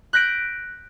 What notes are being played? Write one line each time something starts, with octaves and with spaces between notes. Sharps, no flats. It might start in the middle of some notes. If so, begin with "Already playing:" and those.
F#6 G6 A#6 B6 D7